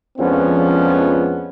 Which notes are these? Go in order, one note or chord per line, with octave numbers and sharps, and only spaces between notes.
F2 F3 G#3 B3 C#4 D4